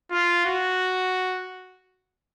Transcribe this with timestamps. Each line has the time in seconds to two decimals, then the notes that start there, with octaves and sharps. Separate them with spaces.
0.11 F4
0.45 F#4